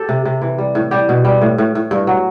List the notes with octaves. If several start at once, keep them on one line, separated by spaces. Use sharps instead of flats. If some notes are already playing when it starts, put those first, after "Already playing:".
Already playing: G4 A4
C3
C3
E3
G3
A2
G3 G4
B2
G3
A2
A2
A2
G2
F#3